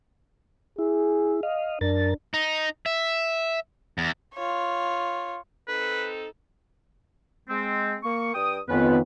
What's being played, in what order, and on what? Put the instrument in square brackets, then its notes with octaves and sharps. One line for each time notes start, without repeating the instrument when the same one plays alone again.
[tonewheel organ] E4 [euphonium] G#4
[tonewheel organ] D#5 F5
[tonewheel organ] F#2 A#4 A6 [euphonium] D4
[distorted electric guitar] D#4
E5
E2
[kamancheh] F4 C#5
[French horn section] C4 D#4 A4 [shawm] B4
[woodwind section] G#3 C4
A#3 C#6
G2 G5 D#6
[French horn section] F2 D#3 B3 [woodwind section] C#4 F4 B4